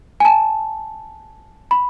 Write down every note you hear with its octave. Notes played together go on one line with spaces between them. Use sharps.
G#5
A5
B5